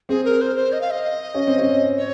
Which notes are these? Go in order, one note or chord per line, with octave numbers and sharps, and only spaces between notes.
C4 G#4
A#4
C5
C5
D#5
F5
D#5
C#4
C4
C#4
C#5